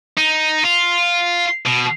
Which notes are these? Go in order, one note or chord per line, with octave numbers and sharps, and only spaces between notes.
D#4
F4
B2